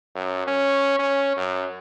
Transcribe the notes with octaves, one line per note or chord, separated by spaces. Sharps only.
F#2
C#4
C#4
F#2